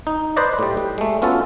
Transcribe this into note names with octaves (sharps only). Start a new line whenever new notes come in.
D#4
B4 C5 D5 D#5
A2 G3
G3
G#3 A3
B3 C#4 F4 F#4 A4